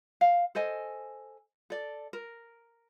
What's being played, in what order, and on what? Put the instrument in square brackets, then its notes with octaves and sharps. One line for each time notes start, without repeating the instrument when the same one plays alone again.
[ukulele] F5
A4 C5 D#5 G#5
A4 D5
A#4